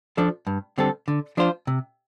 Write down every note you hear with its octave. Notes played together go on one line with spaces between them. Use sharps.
F3 D4 A4 D5
G2
D3 G3 C4 A4
D3
F3 D4 F4 C5
C3